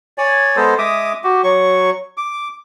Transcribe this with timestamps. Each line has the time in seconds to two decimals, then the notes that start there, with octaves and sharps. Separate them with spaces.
0.18 C#5 D5 G#5
0.56 G#3 B3 A4 C5
0.78 G#3 E5 D6 D#6
1.24 F#4 G4
1.43 F#3 C#6
2.17 D6